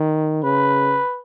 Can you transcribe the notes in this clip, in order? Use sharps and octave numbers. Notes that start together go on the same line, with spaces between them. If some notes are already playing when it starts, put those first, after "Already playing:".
Already playing: D#3
C#3 B4